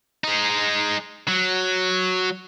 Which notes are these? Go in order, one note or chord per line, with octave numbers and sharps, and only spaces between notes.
G#3 D#4
F#3